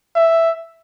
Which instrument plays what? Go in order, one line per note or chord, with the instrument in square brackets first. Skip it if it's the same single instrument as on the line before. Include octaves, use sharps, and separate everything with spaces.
[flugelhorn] E5